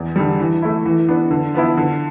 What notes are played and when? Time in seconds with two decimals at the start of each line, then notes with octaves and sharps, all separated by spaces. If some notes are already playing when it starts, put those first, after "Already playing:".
Already playing: E2
0.16 D3 G3
0.40 E3
0.62 A3 E4
0.86 E3
1.08 B3 D4
1.31 D3
1.54 F3 B3 E4
1.77 D3